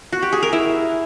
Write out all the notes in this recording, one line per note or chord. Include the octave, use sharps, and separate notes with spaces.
F#4
G4
G#4
A#4
E4